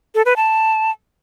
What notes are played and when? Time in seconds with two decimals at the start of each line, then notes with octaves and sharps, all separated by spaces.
0.15 A4
0.26 B4
0.36 A5